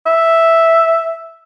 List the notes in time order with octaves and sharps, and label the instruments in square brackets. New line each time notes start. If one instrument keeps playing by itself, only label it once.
[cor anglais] E5